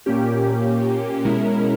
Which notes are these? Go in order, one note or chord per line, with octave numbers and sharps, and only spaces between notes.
A#2 A#3 C#4 G4
B2 G#3 C#4 E4 A#4